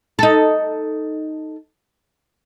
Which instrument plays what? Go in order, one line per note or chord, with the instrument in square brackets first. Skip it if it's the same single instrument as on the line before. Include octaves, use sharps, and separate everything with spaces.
[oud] D#4 A4